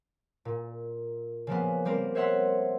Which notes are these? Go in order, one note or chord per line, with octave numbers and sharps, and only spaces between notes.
A#2
C#3 F3 A#3 B3
G3 C4 A#4
C5 C#5 E5 F#5 C6 E6